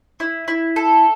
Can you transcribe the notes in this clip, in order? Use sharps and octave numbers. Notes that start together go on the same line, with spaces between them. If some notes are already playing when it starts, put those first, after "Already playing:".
E4
E4
A4